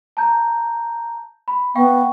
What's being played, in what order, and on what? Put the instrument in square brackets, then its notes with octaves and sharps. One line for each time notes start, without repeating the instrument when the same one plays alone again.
[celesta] A5 A#5 G6
B5
[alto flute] B3 [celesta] F5 G5 C#6